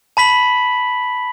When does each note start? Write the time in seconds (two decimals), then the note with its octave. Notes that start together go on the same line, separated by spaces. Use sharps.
0.17 A5 B5 B6 F#7